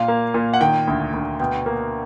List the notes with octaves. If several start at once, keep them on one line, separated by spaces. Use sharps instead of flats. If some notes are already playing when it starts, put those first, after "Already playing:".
Already playing: A#2 F5
A#3
A#2
F#5
D#3 G5
D2
D2
B2 G5
A#3